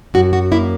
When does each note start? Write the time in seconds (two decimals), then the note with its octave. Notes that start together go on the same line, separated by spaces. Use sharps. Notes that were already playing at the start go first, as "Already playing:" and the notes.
0.14 F#2 F#4
0.33 F#4
0.52 A#3 E4